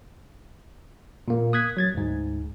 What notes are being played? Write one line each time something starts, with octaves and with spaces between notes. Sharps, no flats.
A#2 A#3
D#6 F#6 G#6 B6
F#3 G#6 A6
D2 G#2